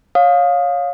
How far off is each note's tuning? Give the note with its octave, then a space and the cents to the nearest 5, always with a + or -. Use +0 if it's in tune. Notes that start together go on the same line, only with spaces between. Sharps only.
C#5 +0 F5 +20 D#6 +0